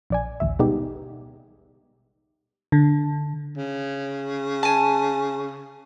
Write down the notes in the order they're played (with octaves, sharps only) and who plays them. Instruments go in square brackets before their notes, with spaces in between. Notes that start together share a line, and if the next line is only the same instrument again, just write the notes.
[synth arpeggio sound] A#1 D5 G#5
A1 D2 E5
B2 G3 G#3 B3 D#4 G4
[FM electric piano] D3
[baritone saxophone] C#3
[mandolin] G#5 A5